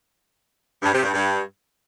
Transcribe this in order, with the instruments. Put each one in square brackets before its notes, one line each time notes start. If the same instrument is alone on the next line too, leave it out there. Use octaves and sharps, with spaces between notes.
[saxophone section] G2
C3
G2
G2